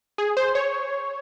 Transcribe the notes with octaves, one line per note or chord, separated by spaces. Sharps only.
G#4
C5
C#5